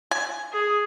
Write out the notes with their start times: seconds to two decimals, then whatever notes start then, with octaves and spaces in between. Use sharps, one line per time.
0.11 G#5
0.52 G#4